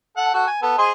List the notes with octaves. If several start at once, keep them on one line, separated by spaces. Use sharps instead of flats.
A4 F#5
F#4 A4
G#5
B3 A4
G#4 C5 D#5